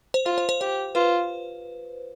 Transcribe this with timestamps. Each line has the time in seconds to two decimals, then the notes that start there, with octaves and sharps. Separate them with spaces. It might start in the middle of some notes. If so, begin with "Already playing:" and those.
0.14 C5
0.26 F4 C5
0.38 C5
0.49 C5
0.61 G4 C5
0.95 F4 B4